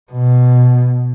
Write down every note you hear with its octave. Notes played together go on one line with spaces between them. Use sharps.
B2